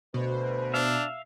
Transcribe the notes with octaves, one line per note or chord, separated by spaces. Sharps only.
D2 B2 B4 C5
D4 E5 F5